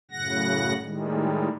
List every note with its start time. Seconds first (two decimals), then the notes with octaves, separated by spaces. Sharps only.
0.11 F#2 A2 C#3 F#5 A#6
0.83 A2 D#3 G3 G#3